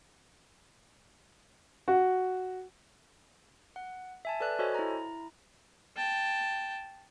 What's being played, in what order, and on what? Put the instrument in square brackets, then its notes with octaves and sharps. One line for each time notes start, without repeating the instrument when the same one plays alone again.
[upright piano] F#4
[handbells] F#5
E5 G#5 A5
A4 B4 D5 F#6
F#4 A4 C5 C#5 D#5 G#5
E4 A#5
[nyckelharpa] G5 A5